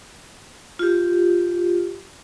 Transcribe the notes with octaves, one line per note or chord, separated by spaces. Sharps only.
F4 G4